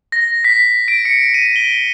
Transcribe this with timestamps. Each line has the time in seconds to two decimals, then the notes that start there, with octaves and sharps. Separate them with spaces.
0.12 A#6
0.44 B6
0.88 D7
1.05 C#7
1.34 D#7
1.56 G7